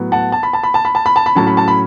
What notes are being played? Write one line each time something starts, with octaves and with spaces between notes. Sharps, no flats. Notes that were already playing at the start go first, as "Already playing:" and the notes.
Already playing: A2 F#3 B3
F#5 A5
A5
B5
A5
B5
A5
B5
A5
B5
A5
B5
A2 F#3 C#4 A5
B5
A5
B5